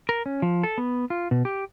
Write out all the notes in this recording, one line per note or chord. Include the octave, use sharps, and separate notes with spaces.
A#4
C#4
F3
A4
B3
F4
B2
G4